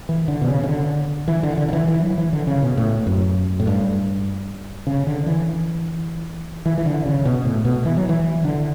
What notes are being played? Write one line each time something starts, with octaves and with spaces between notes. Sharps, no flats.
E3
D3
B2
C#3
C#3
D3
E3
D3
D3
D3
E3
E3
F#3
E3
D3
C#3
B2
A2
F#2
A2
G2
C#3
D3
E3
E3
E3
D3
C#3
B2
A2
B2
E3
F#3
E3
D3